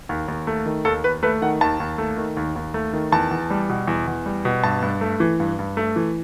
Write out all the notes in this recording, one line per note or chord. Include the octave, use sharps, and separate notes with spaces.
D#2
D#2
A3
D#3
D#2 A4
D#2 B4
A3 B4
D#3 F#5
D#2 A5
D#2
A3
D#3
D#2
D#2
A3
D#3
E2 A5
E2
G3
B2
E2
E2
G3
B2
G2 A5
G2
A3
E3
G2
G2
A3
E3